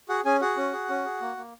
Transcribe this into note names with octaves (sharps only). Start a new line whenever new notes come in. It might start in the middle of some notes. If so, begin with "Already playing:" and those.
F#4 G#4 F#5
C#4 G#4 G#5
F#4 G#4 F#5
C#4
G#4
C#4
G#4
A#3
A#3